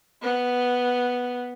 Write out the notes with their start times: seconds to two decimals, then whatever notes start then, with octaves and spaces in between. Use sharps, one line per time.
0.22 B3